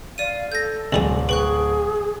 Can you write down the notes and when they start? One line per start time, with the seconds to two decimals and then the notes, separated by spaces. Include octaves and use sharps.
0.18 D5 F5 D#7
0.52 A4 G6 A#6
0.93 D1 C2 G3 G#4
1.29 G#4 B4 G5 C#6 F#6